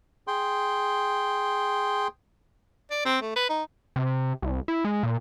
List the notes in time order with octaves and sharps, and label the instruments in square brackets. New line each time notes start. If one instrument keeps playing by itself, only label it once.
[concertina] G#4 G5 C6
[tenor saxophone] D5
C4
A3
B4
D#4
[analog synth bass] C3
C2
E4
G#3
A#2